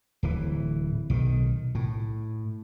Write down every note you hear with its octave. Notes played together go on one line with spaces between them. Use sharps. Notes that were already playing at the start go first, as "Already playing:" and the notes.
D1 E3
B1 D#3
A2